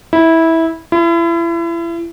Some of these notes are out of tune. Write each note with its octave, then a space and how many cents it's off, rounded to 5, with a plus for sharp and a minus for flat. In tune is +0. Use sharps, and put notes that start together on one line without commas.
E4 -15
E4 +35